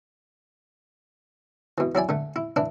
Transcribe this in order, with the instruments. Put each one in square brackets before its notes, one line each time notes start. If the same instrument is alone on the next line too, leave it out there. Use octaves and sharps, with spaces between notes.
[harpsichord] B2 E3
F#3 E4 D5 G#5
D3 A3
E4
E3 D4 E4